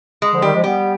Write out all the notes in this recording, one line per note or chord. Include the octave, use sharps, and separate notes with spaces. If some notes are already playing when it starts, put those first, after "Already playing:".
G#3
D3 F3
D#3 G3 G4
F3 G#3
G3 B3 G4